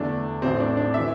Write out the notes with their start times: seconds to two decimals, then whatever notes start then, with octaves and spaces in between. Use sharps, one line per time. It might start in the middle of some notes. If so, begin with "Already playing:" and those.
Already playing: E2 D3 A3 D4
0.42 A1 A2 A3 C4
0.60 D4
0.77 D4
0.94 E3 E5